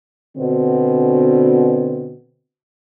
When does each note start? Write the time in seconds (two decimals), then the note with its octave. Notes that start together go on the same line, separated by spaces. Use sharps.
0.38 B2 D3 C4